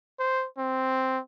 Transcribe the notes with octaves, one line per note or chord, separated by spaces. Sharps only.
C5
C4